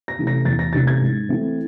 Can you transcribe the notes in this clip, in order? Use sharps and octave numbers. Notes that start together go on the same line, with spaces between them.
A#6
C3 E3 A3 C#4
A#6
E2 A6
A#6
C3 E3 A3 C#4 A6
G#6
G#2
E3 A3 C4 E4